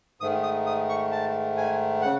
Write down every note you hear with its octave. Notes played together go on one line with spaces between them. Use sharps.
G#2 D#3 A3 D#6
D#6
D#6
C#6
A5
G#5
C#3 F#5